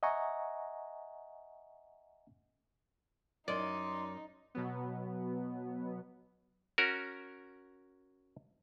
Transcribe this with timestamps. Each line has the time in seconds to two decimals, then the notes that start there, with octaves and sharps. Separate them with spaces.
0.03 D#5 E5 F#5 G#5 A#5 C#6
3.48 F#2 D#4 D5 D#5 C6
4.55 B2 F#3 B3
6.78 C#4 F#4 A#4